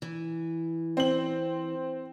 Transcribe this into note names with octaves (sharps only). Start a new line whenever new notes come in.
E3
C4 F#7